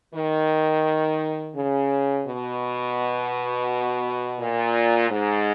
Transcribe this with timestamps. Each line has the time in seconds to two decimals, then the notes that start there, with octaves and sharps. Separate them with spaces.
0.14 D#3
1.56 C#3
2.27 B2
4.40 A#2
5.10 G#2